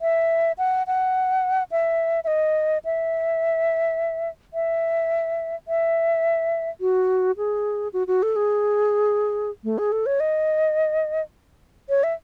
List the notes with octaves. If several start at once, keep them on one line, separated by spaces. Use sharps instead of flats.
E5
F#5
F#5
E5
E5
D#5
E5
E5
E5
F#4
G#4
F#4
F#4
A4
G#4
A3
G#4
A4
C#5
D#5
C#5
E5